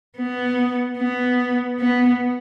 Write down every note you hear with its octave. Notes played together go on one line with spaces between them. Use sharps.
B3
B3
B3